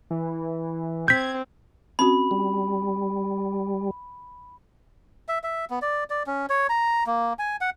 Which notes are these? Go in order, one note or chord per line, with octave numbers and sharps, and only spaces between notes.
E3
C4 G6 G#6 B6
C4 C#4 F#4 B5
G3
E5
E5
B3
D5
D5
C#4
C#5
A#5
A#3
G#5
F#5